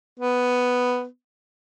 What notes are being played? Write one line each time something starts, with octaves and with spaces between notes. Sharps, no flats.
B3